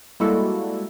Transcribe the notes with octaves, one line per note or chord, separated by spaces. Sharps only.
G3 G#3 A#3 E4 F#4 A4